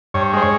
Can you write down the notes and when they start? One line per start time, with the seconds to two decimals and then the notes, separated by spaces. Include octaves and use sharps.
0.14 G2 C#5
0.33 G#3 C5
0.42 C#5